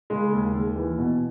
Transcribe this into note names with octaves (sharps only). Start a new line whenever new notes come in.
C#3 G#3
D#2
D#2
E3
B2